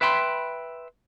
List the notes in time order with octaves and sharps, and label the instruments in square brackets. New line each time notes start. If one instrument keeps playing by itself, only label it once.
[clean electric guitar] B4 E5 G5 B5 C6